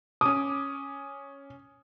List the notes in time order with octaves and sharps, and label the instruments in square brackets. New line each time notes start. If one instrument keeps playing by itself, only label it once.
[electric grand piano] C#4 D6 [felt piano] D#6